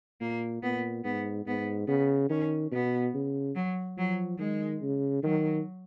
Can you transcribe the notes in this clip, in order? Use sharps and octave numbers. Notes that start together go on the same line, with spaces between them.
A#2 A#3
A#2 B3
G#2 B3
G#2 B3
C#3 B3
D#3 C#4
B2 B3
C#3
F#3
F3 F#3
D#3 G#3
C#3
D#3 F#3